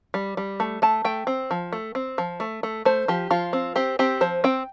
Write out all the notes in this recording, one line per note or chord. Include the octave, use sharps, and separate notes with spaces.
G3
G3
A3
A3 A5
A3 G5
C4
F3
A3
C4
F3
A3
A3
A3 C5
F3 G4
F3 F4
C4
C4 G4
C4 G4
F3 C5
C4 G5